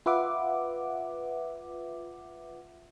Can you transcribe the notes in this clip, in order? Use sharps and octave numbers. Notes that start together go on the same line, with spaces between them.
F4 B4 E5 F#5 D6